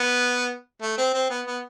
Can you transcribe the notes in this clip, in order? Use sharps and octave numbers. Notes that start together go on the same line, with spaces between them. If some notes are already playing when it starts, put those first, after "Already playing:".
Already playing: B3
A3
C4
C4
B3
B3